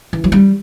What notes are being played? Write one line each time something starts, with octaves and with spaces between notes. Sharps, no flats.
E3
F#3
G3